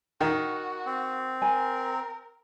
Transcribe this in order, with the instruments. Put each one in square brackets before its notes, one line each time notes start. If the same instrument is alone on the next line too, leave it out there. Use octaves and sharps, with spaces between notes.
[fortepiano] D#3 [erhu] F#4
[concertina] C4
[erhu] A#4 [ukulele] G#5